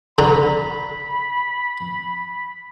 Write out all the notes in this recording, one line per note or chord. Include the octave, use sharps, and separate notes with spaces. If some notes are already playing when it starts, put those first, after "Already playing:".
D3 A#5 B5